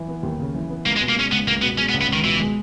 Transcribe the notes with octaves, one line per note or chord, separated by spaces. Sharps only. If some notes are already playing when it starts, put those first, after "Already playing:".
Already playing: E3
B3
D#2
C#3
E3
B3
C#2 A#3
G#3
B2
A#3
G#3 C#4
C#2 B3
C#2 A#3
B2 B3
G#3 C#4
B3
C#2
B3
C#2 D#3
B2 E3
G#3